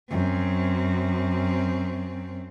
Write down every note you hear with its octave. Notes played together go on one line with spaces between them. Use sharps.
F#2 C4